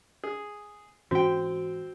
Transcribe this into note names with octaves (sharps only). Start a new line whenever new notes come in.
G#4
G#2 E3 C4 C#4 F#4 G5